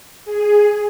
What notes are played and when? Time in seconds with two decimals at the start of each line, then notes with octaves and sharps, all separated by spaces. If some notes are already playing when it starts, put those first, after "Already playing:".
0.25 G#4